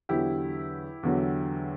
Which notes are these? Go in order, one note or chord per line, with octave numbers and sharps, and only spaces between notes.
E2 D3 F#3 E4 G4
E2 D3 F#3